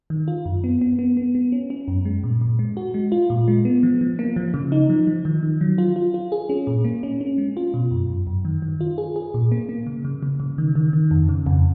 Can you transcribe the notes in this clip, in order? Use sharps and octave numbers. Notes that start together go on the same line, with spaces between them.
D#3
F4
F#2
B3
B3
B3
B3
B3
C#4
C#4
F#2
G#3
A#2
A#2
G#3
F#4
G#3
F4
A#2
G#3
B3
F3
F3
A#3
F3
C#3
D#4
F3
F3
D#3
D#3
F#3
F4
F4
F4
G#4
C#4
A#2
A#3
C#4
C#4
G#3
F4
B2
F#2
F#2
F#2
D#3
D#3
F4
G#4
G#4
A#2
A#3
A#3
C#3
C#3
C#3
C#3
D#3
D#3
D#3
F2
C#3
F2